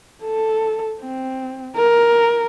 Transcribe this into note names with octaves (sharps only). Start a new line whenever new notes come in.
A4
C4
A#4